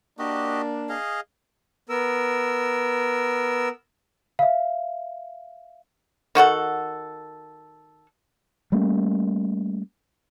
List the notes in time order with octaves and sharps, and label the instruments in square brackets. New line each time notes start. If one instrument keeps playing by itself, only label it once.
[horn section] A#3 D4 [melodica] F#4 G4 D#5
[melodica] G#4 D#5 F5
[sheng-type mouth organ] B3 A#4 E6
[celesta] E5 F5
[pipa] D#3 F#4 A4 F#5
[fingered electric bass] G3 A3 A#3 C#4